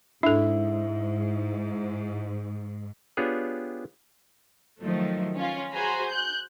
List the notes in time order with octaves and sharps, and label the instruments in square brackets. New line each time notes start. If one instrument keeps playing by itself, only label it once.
[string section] G#2 [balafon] D4 A4 [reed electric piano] E4 E5
[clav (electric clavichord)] B3 D4 F4 G4 G#4 C#5
[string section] D#3 F3 F#3 A3
C#4 F4
F#4 G#4 C5 G#5 A#5 B5
F#6 G6